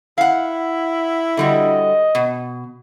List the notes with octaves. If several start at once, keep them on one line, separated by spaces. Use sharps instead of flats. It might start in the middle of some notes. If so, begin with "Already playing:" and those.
E4 F5 F#5
D3 G3 F#4 D#5
B2